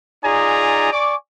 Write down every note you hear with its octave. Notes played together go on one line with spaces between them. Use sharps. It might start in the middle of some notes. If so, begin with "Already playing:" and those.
D#4 F4 G#4 D5 G#5 A#5
D5 G#5 C#6 D6